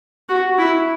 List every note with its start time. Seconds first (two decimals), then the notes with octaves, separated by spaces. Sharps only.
0.29 F#4
0.58 E4